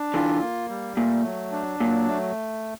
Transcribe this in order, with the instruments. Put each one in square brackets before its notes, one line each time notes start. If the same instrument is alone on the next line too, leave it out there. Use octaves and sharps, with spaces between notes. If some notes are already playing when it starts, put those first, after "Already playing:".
Already playing: [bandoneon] D4
[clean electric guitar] D3 E3 [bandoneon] F4
[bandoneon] A#3
G3
[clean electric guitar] A#2 [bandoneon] A3
[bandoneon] F#3
D4
[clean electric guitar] A#2 [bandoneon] F#3
[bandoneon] A3